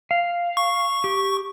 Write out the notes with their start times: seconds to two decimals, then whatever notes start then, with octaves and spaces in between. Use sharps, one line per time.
0.11 F5
0.57 C#6
1.04 G4